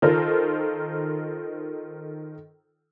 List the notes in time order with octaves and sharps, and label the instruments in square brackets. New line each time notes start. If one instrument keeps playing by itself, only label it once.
[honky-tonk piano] D#3 F4 A4 A#4 C5